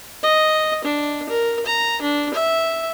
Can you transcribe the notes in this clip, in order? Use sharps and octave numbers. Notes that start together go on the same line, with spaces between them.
D#5
D4
A#4
A#5
D4
E5